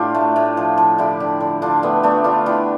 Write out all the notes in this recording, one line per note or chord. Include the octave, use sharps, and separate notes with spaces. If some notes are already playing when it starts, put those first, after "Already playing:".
Already playing: A2 D4 F4 G4
A3
A2
F3
F3
D3 E4 G4
D3
D3
D3 D4 F4
A3 B3 D4
A3 B3 D4
D3 D4 F4
D3 E4 G4